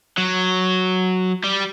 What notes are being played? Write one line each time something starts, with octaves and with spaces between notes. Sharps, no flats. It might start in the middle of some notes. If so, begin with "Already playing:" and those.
F#3
G3